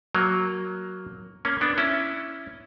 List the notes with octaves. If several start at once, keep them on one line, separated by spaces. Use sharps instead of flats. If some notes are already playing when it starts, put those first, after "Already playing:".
F#3 A#3
A#3 C#4
B3 D4
C#4 E4